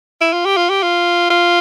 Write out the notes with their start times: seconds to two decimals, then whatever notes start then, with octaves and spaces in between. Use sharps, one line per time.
0.21 E4
0.33 F4
0.45 G4
0.57 F4
0.70 G4
0.82 F4
1.30 F4